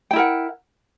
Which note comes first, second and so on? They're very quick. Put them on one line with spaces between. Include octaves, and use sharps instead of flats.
G5 E4 A#4 F#5